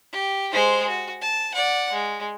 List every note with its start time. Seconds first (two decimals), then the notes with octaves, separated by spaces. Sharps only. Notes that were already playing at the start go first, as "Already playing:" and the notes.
0.12 G4
0.53 G#3 C5
0.89 F#4
1.22 A5
1.55 D5 F#5
1.92 G#3